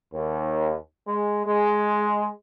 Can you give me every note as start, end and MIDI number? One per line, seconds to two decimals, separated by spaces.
0.14 0.75 39
1.08 1.45 56
1.46 2.29 56